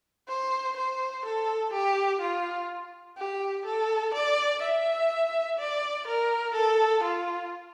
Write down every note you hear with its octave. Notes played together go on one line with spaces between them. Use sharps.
C5
C5
A4
G4
F4
G4
A4
D5
E5
D5
A#4
A4
F4